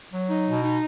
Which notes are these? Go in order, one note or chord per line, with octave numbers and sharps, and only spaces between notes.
F#3
D#4
B2
D#4